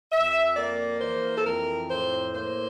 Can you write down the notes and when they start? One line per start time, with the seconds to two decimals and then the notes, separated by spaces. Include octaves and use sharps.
0.12 F2 E5
0.56 A#3 D5
1.01 E3 C5
1.38 A4
1.46 F2 A#4
1.90 A2 C5
2.35 A#3 C5